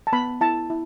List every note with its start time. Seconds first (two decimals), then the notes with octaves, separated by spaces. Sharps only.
0.07 A5
0.13 B3 B5
0.41 E4 A5
0.70 E4